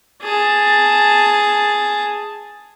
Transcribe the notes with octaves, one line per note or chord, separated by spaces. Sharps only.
G#4 A5